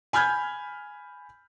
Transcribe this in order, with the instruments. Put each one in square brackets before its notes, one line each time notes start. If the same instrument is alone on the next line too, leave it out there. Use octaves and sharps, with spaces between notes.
[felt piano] G#5 B5 F6 G6 G#6